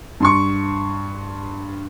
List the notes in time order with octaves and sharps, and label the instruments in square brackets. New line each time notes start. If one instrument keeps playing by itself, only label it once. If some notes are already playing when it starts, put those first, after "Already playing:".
[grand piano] G2 C6 C#6